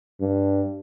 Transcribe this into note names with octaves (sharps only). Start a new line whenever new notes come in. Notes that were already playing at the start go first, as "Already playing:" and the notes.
G2